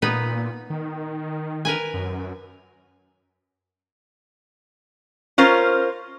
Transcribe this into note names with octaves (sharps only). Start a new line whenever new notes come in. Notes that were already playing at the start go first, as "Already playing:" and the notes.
A#2 B3 D#4 B4
D#3
A#4 B4 G#5
F#2
C#4 F4 A#4 C5